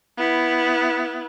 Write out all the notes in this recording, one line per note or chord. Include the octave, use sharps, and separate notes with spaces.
B3 E4